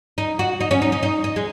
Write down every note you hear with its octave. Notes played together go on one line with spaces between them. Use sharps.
D#4
F#4
D#4
C#4
D#4
D#4
D#4
D#4
G#3